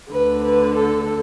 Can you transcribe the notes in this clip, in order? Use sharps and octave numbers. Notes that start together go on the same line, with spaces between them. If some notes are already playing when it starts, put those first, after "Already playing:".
D2 D3 B4
B4
A4